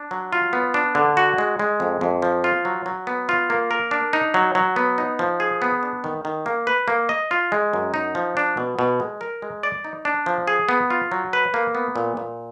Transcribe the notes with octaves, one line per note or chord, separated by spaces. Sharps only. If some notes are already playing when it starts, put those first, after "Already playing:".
Already playing: D4
F#3
F4
B3
D4
D3
F#4
G#3
G#3
F2
F2
F3
F4
F#3
F#3
B3
F4
A#3
A#4
D4
D#4
F#3
F#3
B3
D#4
F3
G#4
B3
D4
D#3
D#3
A#3
B4
A#3
D#5
F4
G#3
F#2
D#4
F3
D4
B2
B2
G#3
A#4
G#3
D5
D#4
D4
F3
G#4
B3
F4
F#3
B4
A#3
B3
A#2
A#2